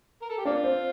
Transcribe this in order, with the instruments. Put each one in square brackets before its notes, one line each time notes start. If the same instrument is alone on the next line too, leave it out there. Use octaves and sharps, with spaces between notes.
[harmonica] A#4
A4
G4
[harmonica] A#3 F4 [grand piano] D4 D5
[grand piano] C4 C5